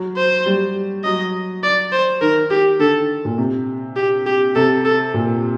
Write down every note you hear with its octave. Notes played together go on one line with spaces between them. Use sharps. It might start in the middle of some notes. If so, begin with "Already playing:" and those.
Already playing: F#3
C5
G3
F#3 D#5
D5
C5
D#3 A#4
G4
D3 A4
A#2
C3
G4
G4
C3 A4
A4
A#2